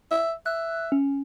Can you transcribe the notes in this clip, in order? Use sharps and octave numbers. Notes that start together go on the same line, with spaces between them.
E5
E5 F#6
C#4